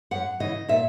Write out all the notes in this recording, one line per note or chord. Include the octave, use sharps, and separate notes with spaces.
F#2 F#5
C#3 E3 D#5
A#2 E5